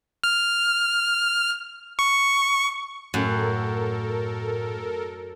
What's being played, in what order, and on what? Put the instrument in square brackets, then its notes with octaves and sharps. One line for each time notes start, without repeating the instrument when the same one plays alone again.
[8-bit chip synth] F6
C#6
[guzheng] F#2 [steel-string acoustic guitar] A2 [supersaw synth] A4 A#4